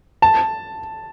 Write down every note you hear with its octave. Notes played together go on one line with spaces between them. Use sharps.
A5